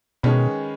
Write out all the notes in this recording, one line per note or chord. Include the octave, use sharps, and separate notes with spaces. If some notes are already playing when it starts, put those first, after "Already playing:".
B2 D#3 G#3 C#4 G#4 B4